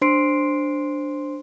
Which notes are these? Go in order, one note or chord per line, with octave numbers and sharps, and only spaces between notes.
D4 C5 C6 C7 D7